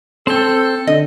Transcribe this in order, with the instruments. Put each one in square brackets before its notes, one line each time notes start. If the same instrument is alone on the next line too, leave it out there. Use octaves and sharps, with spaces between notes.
[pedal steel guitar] C4 G5 [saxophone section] A4
[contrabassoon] D3 [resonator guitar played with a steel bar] D#5